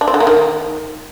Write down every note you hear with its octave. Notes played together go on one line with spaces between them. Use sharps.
D4
C4
D3
A#3
D#3